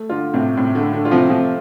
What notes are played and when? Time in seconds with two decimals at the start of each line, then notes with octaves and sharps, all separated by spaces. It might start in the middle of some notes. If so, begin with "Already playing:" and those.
Already playing: A3
0.09 D3 F4
0.33 A2 C3
0.57 A2 C3
0.75 D3
0.81 A3
0.93 D3
1.05 F4
1.11 C3 F3
1.29 C3 F3 A3